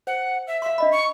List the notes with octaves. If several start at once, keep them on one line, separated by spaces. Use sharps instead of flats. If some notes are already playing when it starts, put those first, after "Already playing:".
C5 F#5
E5
E5 F5 C6
D4 D#5 B5
C#6